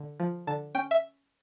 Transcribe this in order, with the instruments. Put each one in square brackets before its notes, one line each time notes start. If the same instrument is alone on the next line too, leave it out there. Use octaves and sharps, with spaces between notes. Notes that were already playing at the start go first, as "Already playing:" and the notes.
Already playing: [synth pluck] D3
F3
D3 A5
C#4 G5
E5